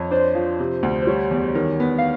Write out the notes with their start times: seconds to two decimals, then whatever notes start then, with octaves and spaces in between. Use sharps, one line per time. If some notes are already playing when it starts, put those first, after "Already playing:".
Already playing: F2 C#5
0.11 D4 C5
0.35 F3
0.59 C3
0.83 D2
1.02 C5
1.07 G3 C#5
1.31 E2
1.55 D#3
1.80 B3
1.98 F5